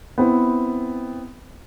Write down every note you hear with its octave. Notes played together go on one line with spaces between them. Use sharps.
B3 C4 E4